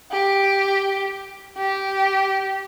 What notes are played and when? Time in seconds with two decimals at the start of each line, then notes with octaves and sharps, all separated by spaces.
0.11 G4
1.58 G4